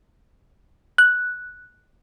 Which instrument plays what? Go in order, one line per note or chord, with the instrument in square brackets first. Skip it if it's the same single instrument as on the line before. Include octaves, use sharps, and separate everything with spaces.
[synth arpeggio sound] F#6